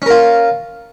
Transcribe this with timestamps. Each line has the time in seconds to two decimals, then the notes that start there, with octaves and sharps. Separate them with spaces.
0.02 C#4
0.06 A#4
0.10 F4